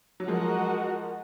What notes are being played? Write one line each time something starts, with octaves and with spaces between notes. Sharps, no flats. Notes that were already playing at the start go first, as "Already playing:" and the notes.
F#3
F3 G#3 F#4 A#4 D#5 F#5